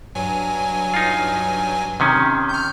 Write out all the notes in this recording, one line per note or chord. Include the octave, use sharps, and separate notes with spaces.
G2 F#3 G#5
D#4 F4
C3 D#3 C#4
F6 G6